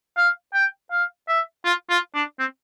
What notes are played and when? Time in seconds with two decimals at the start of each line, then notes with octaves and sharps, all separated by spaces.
0.17 F5
0.54 G5
0.92 F5
1.29 E5
1.65 F4
1.90 F4
2.15 D4
2.39 C4